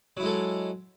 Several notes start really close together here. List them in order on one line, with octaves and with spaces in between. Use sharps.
F#3 E4 G#3 A4